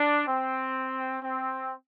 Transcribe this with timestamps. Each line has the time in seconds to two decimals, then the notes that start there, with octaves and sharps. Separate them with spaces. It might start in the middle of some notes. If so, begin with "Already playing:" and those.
Already playing: D4
0.27 C4
1.22 C4